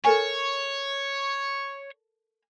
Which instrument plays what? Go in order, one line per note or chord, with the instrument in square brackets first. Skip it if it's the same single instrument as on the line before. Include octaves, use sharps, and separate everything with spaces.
[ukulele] A4 A#4 G#5 [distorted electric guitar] C#5